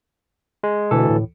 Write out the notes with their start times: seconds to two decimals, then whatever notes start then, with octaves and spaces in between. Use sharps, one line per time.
0.64 G#3
0.91 D2 B2 E3 A4
1.09 A2